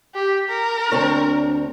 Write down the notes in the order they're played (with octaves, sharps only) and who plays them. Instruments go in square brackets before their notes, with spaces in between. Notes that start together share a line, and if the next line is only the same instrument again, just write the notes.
[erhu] G4
A#4
[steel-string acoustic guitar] D2 C4 C#5 [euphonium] D4